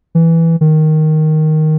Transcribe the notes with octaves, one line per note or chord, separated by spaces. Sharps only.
E3
D#3